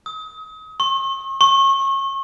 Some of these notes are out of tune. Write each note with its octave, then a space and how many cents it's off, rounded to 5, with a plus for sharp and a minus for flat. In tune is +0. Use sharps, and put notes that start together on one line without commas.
D#6 +35
C#6 -45
C#6 -30